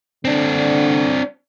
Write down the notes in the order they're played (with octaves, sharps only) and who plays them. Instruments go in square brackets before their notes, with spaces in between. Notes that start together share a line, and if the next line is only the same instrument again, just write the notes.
[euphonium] D3 [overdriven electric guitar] C4 D4